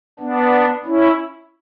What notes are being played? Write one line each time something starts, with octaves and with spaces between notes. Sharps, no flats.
B3 D4
C#4 E4